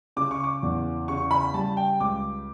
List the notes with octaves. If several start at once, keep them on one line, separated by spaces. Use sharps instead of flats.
C#3 D6
C#6
D6
E2
C#3 C#6
B5
G3 A5
G5
C#2 D6